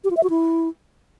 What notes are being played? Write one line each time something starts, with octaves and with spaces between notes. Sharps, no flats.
G4
F4
E5
F#4
E4